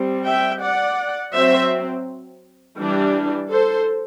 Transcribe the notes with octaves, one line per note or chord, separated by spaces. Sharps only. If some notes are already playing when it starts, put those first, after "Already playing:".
Already playing: G3 C4
E5 G5
D5 F#5
F#3 C4 C5 E5
E3 G3 D4
A4 C5